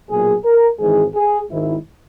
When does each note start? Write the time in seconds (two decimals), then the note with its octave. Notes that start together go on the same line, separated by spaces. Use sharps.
0.10 B1 A#2 G#4
0.45 A#4
0.80 G#1 G#2 E3 G#4
1.15 G#4
1.51 G#1 G#2 D#3 E4